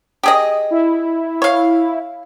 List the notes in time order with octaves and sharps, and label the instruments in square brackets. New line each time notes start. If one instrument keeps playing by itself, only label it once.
[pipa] G4 G#4 D#5
[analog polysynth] E4
[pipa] C#5 F5